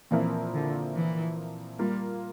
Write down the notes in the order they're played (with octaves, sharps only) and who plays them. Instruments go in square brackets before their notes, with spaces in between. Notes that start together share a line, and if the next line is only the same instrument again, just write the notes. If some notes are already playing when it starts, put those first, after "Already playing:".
[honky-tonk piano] A#2 F3 C4 E4 A#4 [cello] E3
[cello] D3
E3
[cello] G3 [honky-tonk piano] A#3 F4 A#4